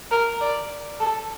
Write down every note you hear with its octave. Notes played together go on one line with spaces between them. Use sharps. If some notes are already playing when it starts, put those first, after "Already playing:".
A#4
D5
A4